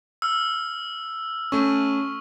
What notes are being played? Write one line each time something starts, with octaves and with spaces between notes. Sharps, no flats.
E6 F6
A3 C#4 C#6